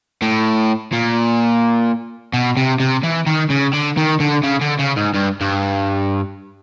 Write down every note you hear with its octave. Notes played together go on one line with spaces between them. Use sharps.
A2
A#2
B2
C3
C3
E3
D#3
C#3
D3
D#3
D3
C#3
D3
C#3
G#2
G2
G2